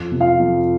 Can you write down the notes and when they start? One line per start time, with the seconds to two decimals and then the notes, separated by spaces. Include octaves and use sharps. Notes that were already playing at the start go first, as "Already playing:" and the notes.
Already playing: F2
0.12 C3
0.21 F4 F5
0.40 F2